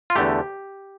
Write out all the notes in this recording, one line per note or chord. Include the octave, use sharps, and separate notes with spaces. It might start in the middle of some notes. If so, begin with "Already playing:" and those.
F4
E2 D3 A3 G4